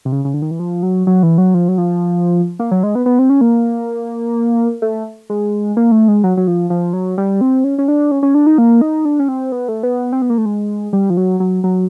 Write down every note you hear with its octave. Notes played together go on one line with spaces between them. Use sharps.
C3
C#3
C#3
D3
D#3
E3
F3
F#3
F#3
E3
F#3
F3
F#3
F3
A#3
F#3
G#3
B3
B3
C4
C#4
A#3
A3
G#3
A#3
A3
G#3
F#3
F#3
F3
F3
F#3
G3
C4
C#4
C#4
D4
C#4
C#4
D4
D#4
A#3
D#4
D4
C#4
C4
B3
A3
B3
C4
B3
A#3
A3
G#3
G3
F3
F#3
F#3
F#3